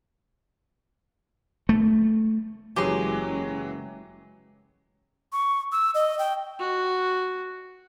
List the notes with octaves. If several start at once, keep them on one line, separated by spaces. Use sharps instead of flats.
A3
F#1 E3 F#3 G#3 C#4 G4 G#4 C6
C#6
E6
D#5
G5
F#4